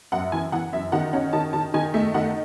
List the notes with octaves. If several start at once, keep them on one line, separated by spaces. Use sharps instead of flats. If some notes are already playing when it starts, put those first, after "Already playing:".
F#2 F#5
E3 G#5
E3 F#5
F#2 E5
D#3 F#5
C#4 F#5
D#3 A5
D#3 A5
D#3 G#5
A3 E5
D#3 F#5